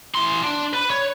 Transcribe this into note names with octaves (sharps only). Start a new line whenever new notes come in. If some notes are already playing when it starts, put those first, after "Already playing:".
E3 C6
D4
B4
C#5